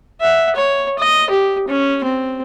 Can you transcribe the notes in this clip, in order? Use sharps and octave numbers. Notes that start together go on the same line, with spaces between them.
E5 F#5
C#5
D#5
G4
C#4
C4